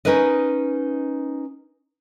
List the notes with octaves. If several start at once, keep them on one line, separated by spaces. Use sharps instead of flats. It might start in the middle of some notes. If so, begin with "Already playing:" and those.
C#4 D#4 A#4 B4 D#5